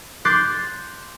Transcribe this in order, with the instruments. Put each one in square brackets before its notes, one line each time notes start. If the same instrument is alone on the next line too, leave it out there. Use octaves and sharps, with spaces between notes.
[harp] C6 D6 F#6 G6 A6 C7